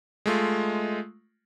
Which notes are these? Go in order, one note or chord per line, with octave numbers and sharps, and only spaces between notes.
G#3 A3 F4